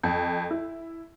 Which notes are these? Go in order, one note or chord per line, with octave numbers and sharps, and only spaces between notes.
F2
E4